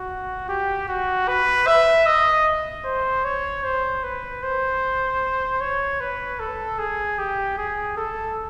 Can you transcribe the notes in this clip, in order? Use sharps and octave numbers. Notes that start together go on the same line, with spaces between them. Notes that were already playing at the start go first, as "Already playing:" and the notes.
Already playing: F#4
G4
F#4
B4
E5
D#5
C5
C#5
C5
B4
C5
C#5
B4
A4
G#4
G4
G#4
A4